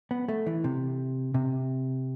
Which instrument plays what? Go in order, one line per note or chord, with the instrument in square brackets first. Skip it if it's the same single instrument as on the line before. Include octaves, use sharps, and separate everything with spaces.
[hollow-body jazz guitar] B3
A3
E3
C3
C3